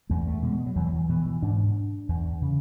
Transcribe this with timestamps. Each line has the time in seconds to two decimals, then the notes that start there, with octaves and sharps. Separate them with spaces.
0.09 E2 A3
0.27 A3
0.42 B2 G#3
0.66 F#3
0.76 E2 E3
0.87 F#3
0.93 E3
1.09 B2 E3
1.26 E3
1.42 G#2 D4
2.09 E2
2.42 C#3